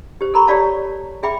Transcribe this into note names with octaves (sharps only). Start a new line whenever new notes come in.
G4 C5
A4 A#4 A#5 B5 C#6
G4 C#5 D5 F5 A5
G#4 E5 G5 B5 D6